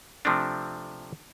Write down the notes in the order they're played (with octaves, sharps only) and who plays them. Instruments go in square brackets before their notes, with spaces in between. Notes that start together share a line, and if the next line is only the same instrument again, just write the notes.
[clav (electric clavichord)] C3 F3 A3 C4 D4